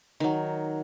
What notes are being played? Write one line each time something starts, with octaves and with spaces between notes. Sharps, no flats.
D#3 F#3